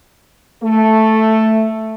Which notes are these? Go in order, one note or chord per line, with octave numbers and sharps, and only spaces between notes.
A3